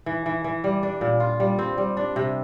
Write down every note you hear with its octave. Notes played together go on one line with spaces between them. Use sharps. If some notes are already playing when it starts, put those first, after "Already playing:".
E3
E3
E3
G3
D4
A#2
F4
G3
C4
G3
D4
C3